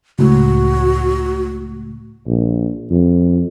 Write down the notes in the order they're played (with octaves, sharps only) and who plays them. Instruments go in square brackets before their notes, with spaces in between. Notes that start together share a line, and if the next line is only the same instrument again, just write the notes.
[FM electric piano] C#2 A2 [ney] F#4
[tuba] A#1
F2